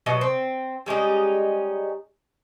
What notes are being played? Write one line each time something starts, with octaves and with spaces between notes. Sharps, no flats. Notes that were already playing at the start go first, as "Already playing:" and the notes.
B2 F#3 C#5 D#5
C4
G3 G#3 C#4 D#4